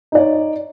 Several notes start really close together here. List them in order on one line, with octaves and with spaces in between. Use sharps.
D#4 D5 C#5